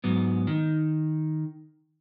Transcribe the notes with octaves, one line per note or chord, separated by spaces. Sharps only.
G#2 F#3 B3
D#3